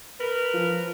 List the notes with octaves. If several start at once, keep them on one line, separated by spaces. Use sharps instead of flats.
A#4 B4
F3